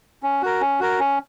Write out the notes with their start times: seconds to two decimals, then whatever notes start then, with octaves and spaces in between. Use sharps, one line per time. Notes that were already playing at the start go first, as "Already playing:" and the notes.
0.23 C#4
0.42 F#4 A#4
0.61 C#4
0.80 F#4 A#4
0.99 C#4